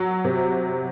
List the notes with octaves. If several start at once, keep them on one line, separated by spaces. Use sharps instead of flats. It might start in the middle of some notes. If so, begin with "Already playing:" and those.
Already playing: F#3
C3